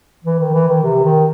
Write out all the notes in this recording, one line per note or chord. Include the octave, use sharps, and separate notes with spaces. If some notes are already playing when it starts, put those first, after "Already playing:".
E3
D#3
E3
D#3
C3
D#3